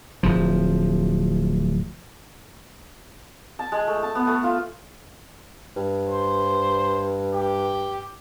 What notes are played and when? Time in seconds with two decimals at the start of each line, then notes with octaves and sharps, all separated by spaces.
0.23 D1 F3
3.59 A5
3.72 G#3
3.87 A3
4.03 A5
4.15 B3
4.27 A3
4.43 F4
5.76 G2
6.09 C5
7.34 G4